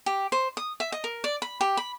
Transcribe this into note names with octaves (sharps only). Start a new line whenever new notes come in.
G4
C5
D#6
E5
D#5
A#4
D5
B5
G4
B5